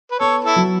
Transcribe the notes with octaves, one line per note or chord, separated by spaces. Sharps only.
B4
B3 A4 C#5
E4 A4
F#3